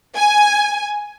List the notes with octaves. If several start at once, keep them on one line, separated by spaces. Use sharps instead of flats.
G#5